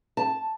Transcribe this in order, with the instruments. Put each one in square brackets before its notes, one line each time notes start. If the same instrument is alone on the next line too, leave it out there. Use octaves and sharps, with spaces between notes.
[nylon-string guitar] A5